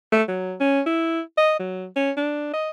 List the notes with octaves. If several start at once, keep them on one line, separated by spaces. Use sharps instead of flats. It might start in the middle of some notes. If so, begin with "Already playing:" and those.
A3
F#3
C#4
E4
D#5
F#3
C#4
D4
D#5